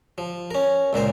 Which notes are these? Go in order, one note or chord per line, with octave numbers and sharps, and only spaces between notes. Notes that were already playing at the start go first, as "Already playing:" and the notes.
F3
C#4 A#4
C#2 A#2 A#4 C5